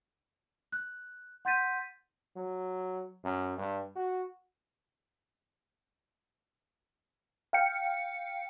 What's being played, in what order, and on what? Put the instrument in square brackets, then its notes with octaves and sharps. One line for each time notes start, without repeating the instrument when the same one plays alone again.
[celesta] F#6
F#5 C6 G6 A6 B6 D#7
[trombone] F#3
F#2
G2
F#4
[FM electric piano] F5 G5 C#7